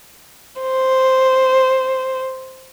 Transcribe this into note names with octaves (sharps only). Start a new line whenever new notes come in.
C5